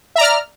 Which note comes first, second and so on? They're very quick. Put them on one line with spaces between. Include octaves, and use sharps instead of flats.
E5 A#5 D5 F6